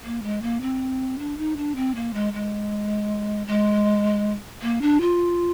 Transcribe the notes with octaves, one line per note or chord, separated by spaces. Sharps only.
A#3
G#3
A#3
C4
D4
D#4
D4
C4
A#3
G#3
G#3
G#3
A#3
D4
F4